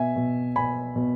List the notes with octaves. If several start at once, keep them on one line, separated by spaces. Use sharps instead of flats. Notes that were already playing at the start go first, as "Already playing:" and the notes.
Already playing: B2 E5 G#5
B2
B2 G#5 B5
B2